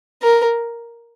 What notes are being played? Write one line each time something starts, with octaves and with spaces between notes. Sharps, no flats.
A#4